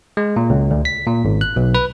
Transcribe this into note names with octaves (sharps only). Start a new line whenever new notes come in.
G#3
A#2
C#2
D2
B6
A#2
G#1
F#6
B1
B4